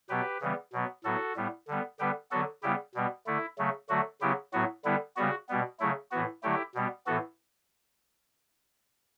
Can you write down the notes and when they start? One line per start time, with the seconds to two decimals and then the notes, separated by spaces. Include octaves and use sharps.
0.09 B2 F#3 B3 G4 B4
0.41 C#3 E3 G3 B3
0.73 B2 F#3 B3
1.04 A2 F#3 B3 F#4 A4
1.36 A2 G3 B3
1.68 D3 G3 B3
1.99 D3 G3 B3 G4 B4
2.31 D3 F#3 B3 F#4 A4
2.63 C#3 G3 B3 E4 G4
2.94 B2 G3 B3
3.27 D3 A3 E4
3.58 C#3 F#3 A3
3.89 D3 F#3 A3 F#4
4.21 C#3 F#3 B3 E4 G4
4.53 A2 F#3 B3 F#4
4.85 D3 G3 B3 E4
5.16 C#3 G3 B3 F#4
5.49 B2 G3 B3
5.80 C#3 F#3 A3 E4
6.11 A2 E3 B3 F#4
6.43 D3 F#3 A3 E4 G4
6.75 B2 G3 B3
7.06 A2 E3 B3 F#4 A4